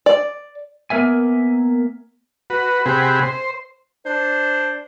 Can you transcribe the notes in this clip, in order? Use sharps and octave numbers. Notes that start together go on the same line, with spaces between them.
D5
A#3 B3 A#4 E5 G#5
F#4 B4
C3 C4 G4 G#4 F#5 B5
C5
D4 C5